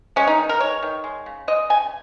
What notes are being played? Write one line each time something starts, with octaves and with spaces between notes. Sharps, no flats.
G#3 C#4
D#4
D#3
A#4
G#3 C#5
D#3
G#3
C#3
G#3 D#5
C#3 G#5